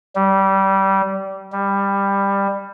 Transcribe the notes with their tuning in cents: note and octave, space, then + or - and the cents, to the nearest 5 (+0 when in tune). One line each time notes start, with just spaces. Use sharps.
G3 -20
G3 +15